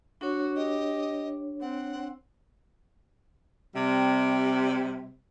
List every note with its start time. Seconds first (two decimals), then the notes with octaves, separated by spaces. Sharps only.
0.21 D4 F#4 C#5
0.56 G4 D#5
1.61 C4 F#5
3.74 C3 G3